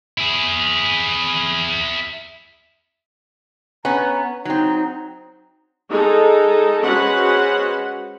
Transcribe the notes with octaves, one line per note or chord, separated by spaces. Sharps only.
E4 G#4
B3 C#4 A#5
F#3 C4 D#4
G#3 D#4 A4
G#3 C#4 F#4 B4 C5 F#5